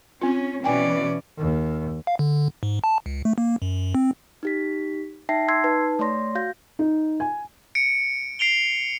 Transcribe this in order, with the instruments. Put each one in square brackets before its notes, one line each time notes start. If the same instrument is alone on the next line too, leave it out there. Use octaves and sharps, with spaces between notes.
[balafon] C4 F4 [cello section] C#4
[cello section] B2 E3 [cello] C#4 D5 [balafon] G5 G#5
[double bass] D#2
[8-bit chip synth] F5
D3
G#2
A5
C#2
A3
A#3
F#2
C4
[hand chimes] D#4 G4 B6
D#4 E5 G5 A5 A#6 C7
C6 E6 G#6 C7
D#4 B4 A5
A3 C#5 D5 C6 A#6
F#4 F5 G6 A#6
[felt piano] D#4
G#5
[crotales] C#7 D7
C7 D7 F7 G7